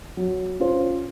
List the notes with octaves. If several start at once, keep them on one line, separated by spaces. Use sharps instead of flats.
F#3
C#4 F4 C5